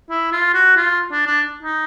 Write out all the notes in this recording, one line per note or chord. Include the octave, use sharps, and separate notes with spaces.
E4
F4
F#4
F4
D4
D4
D#4